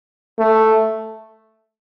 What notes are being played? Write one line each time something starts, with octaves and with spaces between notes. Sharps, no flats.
A3